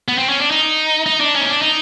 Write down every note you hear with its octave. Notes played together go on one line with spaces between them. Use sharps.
B3
C4
C#4
D4
D#4
D#4
D4
C#4
D#4
D4
D#4